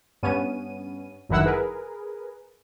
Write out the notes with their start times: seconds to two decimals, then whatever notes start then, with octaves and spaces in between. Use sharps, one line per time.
0.23 G2 B3 C#4 D#7
1.29 G1 F#2 D#3 E4 F#5 E6
1.46 G#4 A#4 B4